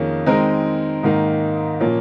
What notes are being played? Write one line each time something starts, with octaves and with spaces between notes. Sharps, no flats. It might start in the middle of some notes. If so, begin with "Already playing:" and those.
Already playing: F2 D#3 A#3 C#4 G#4
D#3 G#3 C4 D#4 A#4
G#2 D#3 A#3 D#4
A#2 F3 A#3 C#4 F4